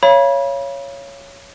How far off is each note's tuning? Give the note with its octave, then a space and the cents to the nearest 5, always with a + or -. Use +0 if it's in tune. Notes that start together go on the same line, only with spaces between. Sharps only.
C#5 +0 F5 -35 B5 -35